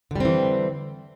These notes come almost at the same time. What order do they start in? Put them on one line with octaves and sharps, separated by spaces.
D3 G3 C4 E3